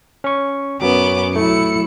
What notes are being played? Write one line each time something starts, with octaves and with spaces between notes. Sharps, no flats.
C#4 C#6
F#2 F#3 B3 C#4 D6
F#3 A3 E4 C#7